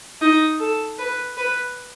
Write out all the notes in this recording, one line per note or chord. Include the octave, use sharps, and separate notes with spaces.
D#4
A4
B4
B4